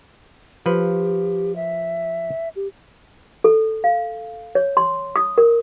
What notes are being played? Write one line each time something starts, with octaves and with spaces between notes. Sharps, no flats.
F3 G4 B4
E5
G4
A4
F5
C#5
C6
D#6
A#4